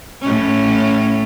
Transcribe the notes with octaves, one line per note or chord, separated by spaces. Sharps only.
A2 C#4